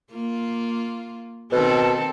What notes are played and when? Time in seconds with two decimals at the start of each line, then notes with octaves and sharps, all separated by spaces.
0.11 A#3 F4
1.52 B2 D#3 C4 A4